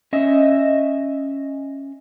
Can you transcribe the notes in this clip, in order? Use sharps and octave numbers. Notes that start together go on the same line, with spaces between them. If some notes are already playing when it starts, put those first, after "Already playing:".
C#4 D#5 E5